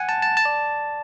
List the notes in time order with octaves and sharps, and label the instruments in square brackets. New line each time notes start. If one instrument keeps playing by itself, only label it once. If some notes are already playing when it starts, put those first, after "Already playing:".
Already playing: [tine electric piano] F#5 G#5
A5
A5
A5
D5